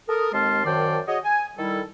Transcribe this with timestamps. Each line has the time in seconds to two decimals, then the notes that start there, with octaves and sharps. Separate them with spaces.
0.09 A4 A#4 D#6
0.33 D#2 G#3 C4 A5 C6 F6
0.65 F#2 D#3 C5 D5 G5 A5
1.07 F#4 G#4 C#5 D#5
1.24 G#5
1.58 D#3 G3 E4 A4